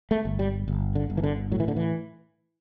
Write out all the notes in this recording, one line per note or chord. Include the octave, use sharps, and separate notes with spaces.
A3
G1
G3
G1
D3
G1
E3
D3
A2 F#3
E3
D3
E3